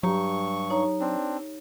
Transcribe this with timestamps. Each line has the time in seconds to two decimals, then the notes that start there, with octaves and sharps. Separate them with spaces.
0.03 G2 F#3 G4 A#5 C#6
0.70 D#4 C#5 A#5
1.00 C4 D4